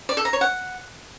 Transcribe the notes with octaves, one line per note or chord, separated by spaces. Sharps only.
D5
A4
A#5
C#5
F#5